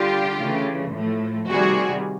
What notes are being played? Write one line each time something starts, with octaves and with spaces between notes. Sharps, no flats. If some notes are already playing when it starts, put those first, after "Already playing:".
Already playing: D3 G3 F4 G4
C#3 E3 A3
A2 F3 A3
C3 D#3 G3 F#4 G#4